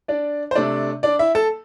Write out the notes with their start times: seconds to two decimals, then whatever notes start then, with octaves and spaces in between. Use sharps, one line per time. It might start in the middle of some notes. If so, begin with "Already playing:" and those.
0.08 D4 D5
0.51 C5
0.55 C3 A3 D4 D5
1.03 D4 D5
1.19 E4 E5
1.35 A4 A5